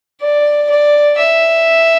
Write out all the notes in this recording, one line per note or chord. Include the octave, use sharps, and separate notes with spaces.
D5
D5
E5